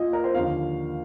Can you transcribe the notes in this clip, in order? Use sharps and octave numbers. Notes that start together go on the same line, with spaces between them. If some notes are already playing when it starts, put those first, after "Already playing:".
Already playing: A#2 D#5
A#4
C5
D#2 D3 F3 A#3 D#4 F5